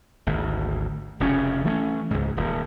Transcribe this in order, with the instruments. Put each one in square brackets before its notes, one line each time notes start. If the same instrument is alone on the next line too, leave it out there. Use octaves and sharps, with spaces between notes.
[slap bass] G#1 D2
F1 F2 C#3 C#4
E3 A3 B3 C#4
C#2 G#2
D#1